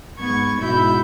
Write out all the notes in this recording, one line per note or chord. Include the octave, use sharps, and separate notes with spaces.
G#2 B3 C#6 G#6
G#2 B2 E4 F#4 B5 G6